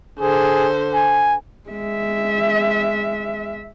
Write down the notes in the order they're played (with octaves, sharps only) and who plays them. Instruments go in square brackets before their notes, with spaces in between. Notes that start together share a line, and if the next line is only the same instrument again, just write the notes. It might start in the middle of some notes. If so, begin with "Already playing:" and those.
[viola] D3 C5 [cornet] G#4
[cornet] G#5
[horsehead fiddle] G#3 E5